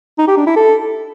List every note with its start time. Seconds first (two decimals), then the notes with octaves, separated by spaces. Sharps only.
0.18 D#4
0.28 G4
0.37 D4
0.47 E4
0.56 A4